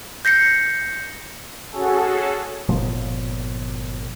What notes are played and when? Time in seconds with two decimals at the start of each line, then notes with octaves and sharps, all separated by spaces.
0.25 G6 A#6 C7 C#7
1.71 C#4 F#4 G#4 A4
2.69 G1 A#2 F3 B3